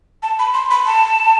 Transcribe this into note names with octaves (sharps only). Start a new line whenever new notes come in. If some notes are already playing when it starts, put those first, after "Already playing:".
A5
B5
C6
B5
A5